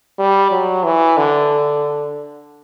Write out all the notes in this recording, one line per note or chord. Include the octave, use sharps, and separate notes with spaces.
G3
F#3
E3
D3